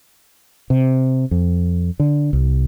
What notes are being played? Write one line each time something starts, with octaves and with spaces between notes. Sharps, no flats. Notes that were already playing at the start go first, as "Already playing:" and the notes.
C3
F2
D3
C2